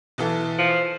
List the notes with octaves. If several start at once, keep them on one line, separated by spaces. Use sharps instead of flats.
B1 E3 A4
F3